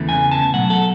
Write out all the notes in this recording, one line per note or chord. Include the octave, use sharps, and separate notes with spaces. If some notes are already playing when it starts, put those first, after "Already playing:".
Already playing: E2 C#3 E3 A3
G#5
A5
B2 F#3 A3 F#5
A4